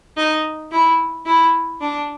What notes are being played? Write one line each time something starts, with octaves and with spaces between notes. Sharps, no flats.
D#4
E4
E4
D4